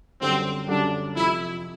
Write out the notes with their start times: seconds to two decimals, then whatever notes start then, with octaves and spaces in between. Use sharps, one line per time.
0.21 F#2 D3 G3 C4
0.68 F#2 D3 G3 D4
1.16 F2 C3 F3 E4